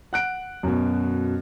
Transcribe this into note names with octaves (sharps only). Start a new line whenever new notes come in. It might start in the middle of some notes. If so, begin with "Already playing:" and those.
F#5 F#6 D7
F#2 B2